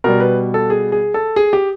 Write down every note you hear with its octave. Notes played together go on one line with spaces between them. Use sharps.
B2 G3 A#4
B4
A4
G#4
G#4
A4
G#4
G4